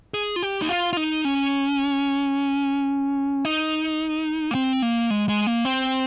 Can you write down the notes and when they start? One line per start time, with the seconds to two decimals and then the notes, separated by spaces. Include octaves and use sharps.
0.14 G#4
0.36 F4
0.42 G4
0.62 D#4
0.69 F4
0.93 F4
0.97 D#4
1.25 C#4
3.45 D#4
4.51 A#3
4.55 C4
4.82 A#3
5.10 G#3
5.29 G#3
5.47 A#3
5.65 C4